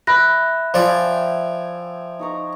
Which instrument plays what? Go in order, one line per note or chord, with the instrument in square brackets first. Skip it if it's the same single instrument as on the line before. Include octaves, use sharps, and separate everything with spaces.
[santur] E5 [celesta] B5 F#6 A#6
[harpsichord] F3 D5 [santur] E5 G5 G#5
[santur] D#4 C#5 A#5